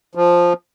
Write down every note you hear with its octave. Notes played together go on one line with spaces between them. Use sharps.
F3